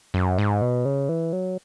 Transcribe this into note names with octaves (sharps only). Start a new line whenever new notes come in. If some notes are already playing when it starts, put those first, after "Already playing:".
F#2
G#2
B2
C#3
E3
F#3